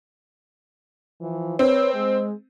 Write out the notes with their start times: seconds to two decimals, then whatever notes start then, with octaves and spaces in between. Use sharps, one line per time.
1.21 E3 F3
1.59 C4 B4 C#5
1.94 G#3